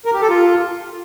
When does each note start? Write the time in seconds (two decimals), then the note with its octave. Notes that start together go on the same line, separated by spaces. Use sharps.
0.05 A#4
0.14 G4
0.22 A4
0.30 F4